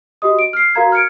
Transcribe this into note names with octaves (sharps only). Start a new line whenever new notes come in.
F#4 G4 D#5 D#6
D7
F6 C7
F#4 A#4 F5 A#5 G#6
F6 G#6 C#7 D7